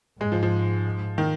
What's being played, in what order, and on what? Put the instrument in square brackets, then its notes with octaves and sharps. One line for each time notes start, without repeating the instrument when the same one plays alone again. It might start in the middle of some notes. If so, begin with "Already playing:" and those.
[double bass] G#2 [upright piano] G#3
[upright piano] F3
F3
D#3